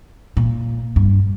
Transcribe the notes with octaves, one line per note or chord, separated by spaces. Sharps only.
A#2
G2